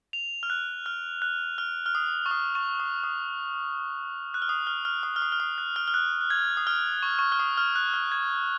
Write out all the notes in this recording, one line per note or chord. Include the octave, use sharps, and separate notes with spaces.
F7
F6
F#6
F6
F#6
F6
F6
D#6
C#6
D#6
C#6
D#6
D#6
F#6
F6
D#6
F6
F6
D#6
F6
D#6
F6
D#6
F#6
F6
F6
F#6
F#6
G#6
D#6
F6
C#6
C#6
F6
D#6
F6
F#6
F6
G#6